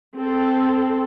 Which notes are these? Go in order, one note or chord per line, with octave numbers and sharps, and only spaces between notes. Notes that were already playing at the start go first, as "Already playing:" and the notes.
C4 A4